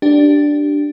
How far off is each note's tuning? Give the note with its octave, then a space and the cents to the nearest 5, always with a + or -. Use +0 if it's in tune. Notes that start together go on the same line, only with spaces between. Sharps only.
D4 +0 G4 -10